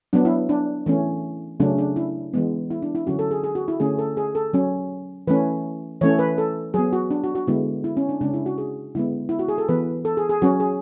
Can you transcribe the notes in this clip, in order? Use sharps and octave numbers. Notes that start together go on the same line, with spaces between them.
F#3 B3 D4
E4
D4
E3 A3 C#4
C#3 F#3 A3 C#4 D4
D4
E4
E3 G#3 B3
E4
D4
E4
D3 F#3 C#4 F#4
A4
G#4
G#4
F#4
E4
D3 A3 C#4 G#4
A4
G#4
A4
F#3 C#4
E3 A3 C#4 B4
E3 A3 C#4 C#5
B4
A4
F#3 B3 G#4
F#4
D4
F#4
F#4
D3 G#3 B3 E4
E4
C#4
D4
C#3 G#3 C#4 D4
E4
F#4
G#4
D3 G#3 B3 E4
E4
F#4
G#4
A4
E3 B3 B4
A4
G#4
G#4
F#3 C#4 F#4
G#4